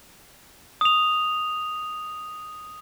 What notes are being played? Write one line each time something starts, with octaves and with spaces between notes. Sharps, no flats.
D#6 F7